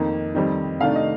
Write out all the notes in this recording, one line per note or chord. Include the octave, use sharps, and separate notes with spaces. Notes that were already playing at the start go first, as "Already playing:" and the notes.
Already playing: F2 D#3 A#3 D#4
F2 D#3 G3 C4 D#4
C3 D#3 A3 D4 F5
D#5